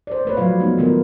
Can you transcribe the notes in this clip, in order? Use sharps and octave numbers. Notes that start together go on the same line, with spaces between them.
C5 D5
A3 B4 C#5
F3 F#3 F4 F5
G#3 A3 B3 D#4
D#3 B3 F4 A#4